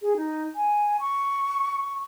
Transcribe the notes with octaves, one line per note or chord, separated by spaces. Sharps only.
G#4
D#4
G#5
C#6